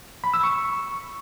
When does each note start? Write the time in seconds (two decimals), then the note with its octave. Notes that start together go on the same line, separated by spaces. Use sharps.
0.24 B5
0.34 E6
0.43 C#6